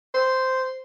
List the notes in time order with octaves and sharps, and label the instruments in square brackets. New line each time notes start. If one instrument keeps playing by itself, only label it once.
[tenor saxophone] C5